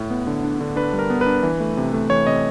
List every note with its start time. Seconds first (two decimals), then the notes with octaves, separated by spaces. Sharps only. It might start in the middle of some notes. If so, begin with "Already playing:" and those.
Already playing: A2
0.10 B3
0.27 D3
0.43 D4
0.61 D3
0.76 D4 B4
0.93 G3
0.99 A#4
1.10 B3
1.21 B4
1.26 D4
1.43 E3
1.60 A3
1.77 C3
1.93 A3
2.10 E3 C#5
2.27 C3 D#5